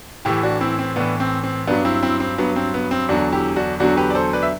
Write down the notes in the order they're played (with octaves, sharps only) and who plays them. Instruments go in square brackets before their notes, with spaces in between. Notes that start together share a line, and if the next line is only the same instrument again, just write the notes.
[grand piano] A2 E3 E4 G4
D4 F#4
C4 E4
C4
A2 E3 B3 D4
C4
C4
G2 F#3 B3 D4
C4 E4
C4 E4
C4
G2 F#3 B3
C4
B3
C4
E2 D3 F#3 D4 F#4
E4 G4
D4 F#4
E2 D3 F#3 D4 F#4
G4 B4
D5
A4 C5
B4 D5
E5